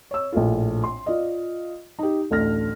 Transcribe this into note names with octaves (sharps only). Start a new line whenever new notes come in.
C#5 E6
A#1 A2 F4
C6
F4 D5 D#5
D#4 G4
A1 D2 D4 F6 A#6